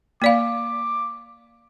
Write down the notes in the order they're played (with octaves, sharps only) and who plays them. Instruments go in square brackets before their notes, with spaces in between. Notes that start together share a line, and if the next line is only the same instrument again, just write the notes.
[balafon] A#3 D5 F5 [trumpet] D6